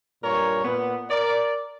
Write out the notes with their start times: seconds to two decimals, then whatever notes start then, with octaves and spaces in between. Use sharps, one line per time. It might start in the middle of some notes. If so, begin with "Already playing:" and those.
0.23 G2 A#2 A#4 C#5
0.64 A#2 B3
1.10 A#4 D5